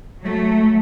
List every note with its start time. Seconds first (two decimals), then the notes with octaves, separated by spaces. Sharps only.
0.22 F#3 A3